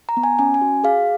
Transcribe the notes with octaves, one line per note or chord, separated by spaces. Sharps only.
A#5
B3
G#5
C#4 G#5
G#5
F#4
G#4 F5